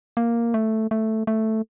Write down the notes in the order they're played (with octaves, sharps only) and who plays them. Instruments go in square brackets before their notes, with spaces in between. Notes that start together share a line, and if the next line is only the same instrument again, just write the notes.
[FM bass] A#3
A3
A3
A3